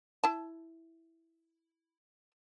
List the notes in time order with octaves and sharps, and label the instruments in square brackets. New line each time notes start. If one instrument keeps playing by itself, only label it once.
[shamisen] E4 A5